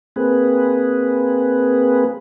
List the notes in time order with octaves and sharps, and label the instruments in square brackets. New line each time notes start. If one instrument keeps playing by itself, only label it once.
[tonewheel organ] A#3 C4 G#4 B4